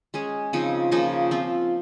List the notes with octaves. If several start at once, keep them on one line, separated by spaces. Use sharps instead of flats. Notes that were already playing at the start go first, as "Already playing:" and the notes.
G#3 C#4 G#4
C#3 F3 C4 D#4
C#3 F3 A#3 D#4
F3 C4 F4